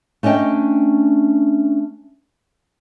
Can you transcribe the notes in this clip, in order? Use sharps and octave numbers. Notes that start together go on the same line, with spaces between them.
A3 C#4 D4 D#5 G5